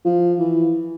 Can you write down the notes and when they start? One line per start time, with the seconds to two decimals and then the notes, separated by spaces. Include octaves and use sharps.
0.05 F3
0.39 E3